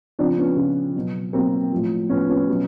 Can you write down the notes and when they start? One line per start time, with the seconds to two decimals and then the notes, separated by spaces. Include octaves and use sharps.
0.19 C#3 F3 C4 D4
0.38 B3 C#4
0.57 C#3 F3
0.95 B2 F#3
1.33 B2 F#3 A#3 C4
1.72 A2 F3
2.09 A2 F3 B3 C#4
2.29 B3 C#4
2.48 B2 F#3